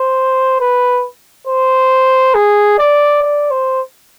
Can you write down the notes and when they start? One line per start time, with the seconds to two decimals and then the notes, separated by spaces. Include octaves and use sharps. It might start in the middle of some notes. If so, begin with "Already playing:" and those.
Already playing: C5
0.60 B4
1.47 C5
2.34 G#4
2.78 D5
3.22 D5
3.51 C5